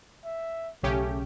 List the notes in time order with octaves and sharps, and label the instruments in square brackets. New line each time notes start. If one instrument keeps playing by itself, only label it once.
[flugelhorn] E5
[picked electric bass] B1 [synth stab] C#3 C#4 G4 [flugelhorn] A3